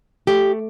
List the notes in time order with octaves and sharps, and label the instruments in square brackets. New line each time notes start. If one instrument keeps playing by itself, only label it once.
[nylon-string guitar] A3 G4